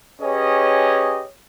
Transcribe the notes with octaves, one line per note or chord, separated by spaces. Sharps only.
C#4 G4 G#4 B4 C#5 D#5